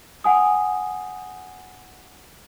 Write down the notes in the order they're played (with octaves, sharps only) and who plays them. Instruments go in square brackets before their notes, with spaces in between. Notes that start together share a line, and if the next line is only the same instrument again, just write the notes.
[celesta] F#5 G#5 D#6